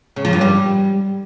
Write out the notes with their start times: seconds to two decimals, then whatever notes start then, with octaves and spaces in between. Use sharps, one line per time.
0.16 C#3
0.25 F3
0.33 G2
0.41 G3